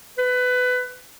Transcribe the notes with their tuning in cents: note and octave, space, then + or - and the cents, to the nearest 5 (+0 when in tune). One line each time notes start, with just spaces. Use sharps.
B4 +20